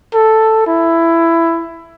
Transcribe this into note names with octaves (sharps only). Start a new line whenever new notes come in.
A4
E4